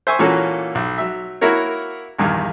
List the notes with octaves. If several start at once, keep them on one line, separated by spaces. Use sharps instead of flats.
C5 E5 G#5 C#6
A#2 E3 A#3 C#4 F#4 A4
B1
F#3 E5
A#3 E4 F#4 A#4 C#5
A#1 E2 G2 D#3